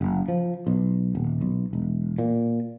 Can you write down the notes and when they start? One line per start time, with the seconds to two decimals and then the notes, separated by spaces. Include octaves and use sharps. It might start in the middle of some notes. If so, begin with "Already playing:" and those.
0.01 F#1
0.28 F3
0.67 B1
1.15 D#1
1.41 B1
1.73 E1
2.18 A#2